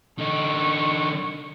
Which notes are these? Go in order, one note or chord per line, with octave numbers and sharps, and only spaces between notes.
D3 D#4 C#6